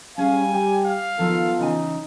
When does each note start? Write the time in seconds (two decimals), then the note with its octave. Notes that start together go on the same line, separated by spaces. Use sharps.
0.18 G3 C#4 G#4 F5 G#5
0.54 G4 G5
0.85 F5
1.19 D#3 F3 B3 F4 A4
1.59 C#3 E3 D#4 G#5